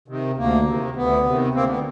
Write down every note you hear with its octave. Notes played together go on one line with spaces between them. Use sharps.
C3 D#3
D2 A#3
C3 D#3
D2 B3
C3 D#3
D2 A#3 C4
B3